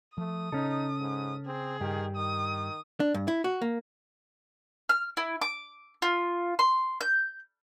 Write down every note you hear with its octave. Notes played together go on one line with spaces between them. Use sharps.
F3 A3 D#6
C#3 C#4 D#4 A4
G#2
C4 G#4
G2 D#3 G4
D#3 D#6
D4
G2
E4
F#4
A#3
F6
E4
D6
F4
C6
G6